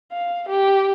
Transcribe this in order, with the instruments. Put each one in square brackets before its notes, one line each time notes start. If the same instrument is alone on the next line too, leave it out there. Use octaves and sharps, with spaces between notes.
[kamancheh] F5
G4